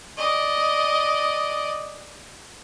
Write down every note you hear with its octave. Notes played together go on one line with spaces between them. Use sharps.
D5 D#5